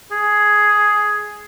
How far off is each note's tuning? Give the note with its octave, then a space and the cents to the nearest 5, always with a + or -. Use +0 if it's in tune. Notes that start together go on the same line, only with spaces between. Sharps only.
G#4 +5